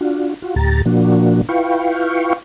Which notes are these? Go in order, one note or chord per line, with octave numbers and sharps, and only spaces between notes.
D4 F4 F#4
F4 F#4
D2 A2 G4 A#5 A6
A#2 F3 A#3 D4 F#4
E4 F4 B4 F5 G5 C#6